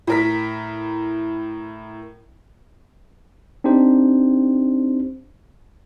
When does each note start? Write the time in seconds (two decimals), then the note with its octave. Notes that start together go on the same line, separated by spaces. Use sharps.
0.07 A2 A#4 B6
3.64 C4 D4 D#4 G4 C5